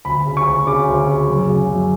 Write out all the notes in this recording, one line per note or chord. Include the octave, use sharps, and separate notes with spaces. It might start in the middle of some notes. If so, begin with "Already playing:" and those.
D2 B5
C#3
C#6
D2
C#3 D6
D2
C#3
F#2
C#3
F#2